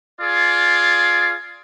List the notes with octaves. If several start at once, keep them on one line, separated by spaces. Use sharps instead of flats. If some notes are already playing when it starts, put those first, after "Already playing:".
F4 G#4 D5